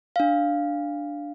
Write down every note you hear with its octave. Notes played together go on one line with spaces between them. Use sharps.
D4 F5